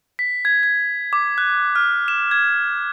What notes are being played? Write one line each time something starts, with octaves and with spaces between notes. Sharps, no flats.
B6
G#6
G#6
D6
F#6
F6
E7
G#6